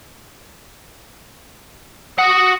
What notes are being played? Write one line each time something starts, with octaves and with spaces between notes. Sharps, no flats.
F#4 F#5 D#6